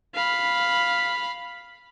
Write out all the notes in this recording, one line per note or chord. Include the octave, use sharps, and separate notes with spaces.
F5 B5